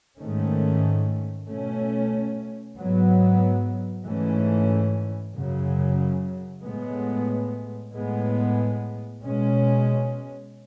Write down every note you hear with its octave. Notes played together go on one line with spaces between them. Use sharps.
G#2 D#3 A3 C#4
B2 A3 C#4
G#2 F#3 B3
G#2 E3 A3 C#4
F#2 C#3 F#3
A2 G#3 B3
A2 G#3 B3
B2 G#3 C#4